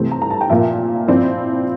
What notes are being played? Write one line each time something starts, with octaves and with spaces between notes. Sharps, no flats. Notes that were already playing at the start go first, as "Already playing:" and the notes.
Already playing: C3 E3 A3 C4
A#5
A#5
A5
G5
A#2 F3 A#3 E5
F3 C4 E4 D5